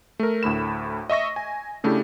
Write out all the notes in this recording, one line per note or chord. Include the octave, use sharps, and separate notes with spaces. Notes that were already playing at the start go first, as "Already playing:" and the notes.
A3 A#4
D2 A2 B5 E7
D#5 E5 C#6 A#6
G#5
C#3 A3 D4 E4 G4